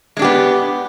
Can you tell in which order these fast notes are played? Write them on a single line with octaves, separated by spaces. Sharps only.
G#3 D4 G4 B3